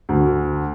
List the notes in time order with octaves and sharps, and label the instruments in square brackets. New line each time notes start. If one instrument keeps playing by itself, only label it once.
[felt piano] D2